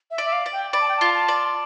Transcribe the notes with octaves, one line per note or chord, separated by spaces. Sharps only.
E5
D5
E5
F5
D5
G5
D5 B5
A5
G5
F4 A5
A5
D5